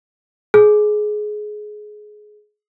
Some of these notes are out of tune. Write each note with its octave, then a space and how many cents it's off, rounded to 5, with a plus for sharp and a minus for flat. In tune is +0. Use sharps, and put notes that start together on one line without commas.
G#4 +20